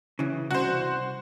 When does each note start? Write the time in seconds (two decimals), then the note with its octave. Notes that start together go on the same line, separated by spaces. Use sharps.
0.19 C#3 E3
0.51 C2 F#4 C5